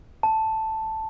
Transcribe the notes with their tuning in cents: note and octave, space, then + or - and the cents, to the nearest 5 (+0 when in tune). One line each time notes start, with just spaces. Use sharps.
A5 +0